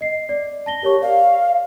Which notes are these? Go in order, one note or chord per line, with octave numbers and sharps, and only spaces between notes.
D#5 C7
D5
A5 A#6 G7
G4 A#4 C#5 C#6
D5 F5